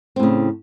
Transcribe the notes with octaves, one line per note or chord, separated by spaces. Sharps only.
A2 C#3 C4